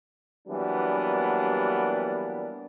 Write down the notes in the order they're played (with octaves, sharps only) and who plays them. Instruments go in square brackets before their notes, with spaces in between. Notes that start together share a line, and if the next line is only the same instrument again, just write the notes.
[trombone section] E3 F#3 G3 A#3 B3 D4